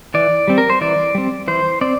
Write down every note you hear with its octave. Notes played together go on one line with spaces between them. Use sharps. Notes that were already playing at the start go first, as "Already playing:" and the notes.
E3 D5
G3 C4
A#4
C5
E3 D5
G3 C4
E3 C5
C4 D5